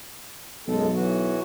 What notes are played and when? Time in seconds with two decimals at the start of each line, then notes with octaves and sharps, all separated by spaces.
0.67 B1 F#2 G#3 A4
0.93 E3 F#3 F#4